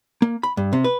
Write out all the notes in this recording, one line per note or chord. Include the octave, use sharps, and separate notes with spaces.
A#3
B5
G2
C3
B4